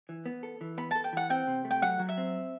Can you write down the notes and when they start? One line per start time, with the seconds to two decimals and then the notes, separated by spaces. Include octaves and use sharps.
0.09 E3
0.26 B3
0.43 A4
0.61 E3
0.78 B3 B5
0.91 A5
0.96 A4
1.04 G5
1.13 E3 F#5
1.30 C4 G5
1.47 C3
1.65 A3
1.71 G5
1.82 F#3 F#5
2.00 F#3
2.09 E5
2.17 C4